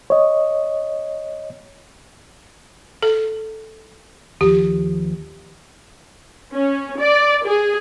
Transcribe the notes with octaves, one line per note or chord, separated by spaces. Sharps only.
C#5 D#5
A4
D#2 F3 G4
C#4
D5
G#4